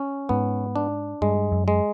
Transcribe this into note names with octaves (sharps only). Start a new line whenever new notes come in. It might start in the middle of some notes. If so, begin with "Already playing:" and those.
Already playing: C#4
G#2 B3
D4
G2 G#3
F#2
G#3